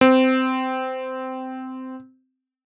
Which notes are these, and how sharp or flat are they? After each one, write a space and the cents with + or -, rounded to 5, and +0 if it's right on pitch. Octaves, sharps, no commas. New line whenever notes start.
C4 -15